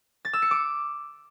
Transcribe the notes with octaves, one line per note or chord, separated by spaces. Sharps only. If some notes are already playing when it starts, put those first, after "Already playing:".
A6
E6
C#7
D6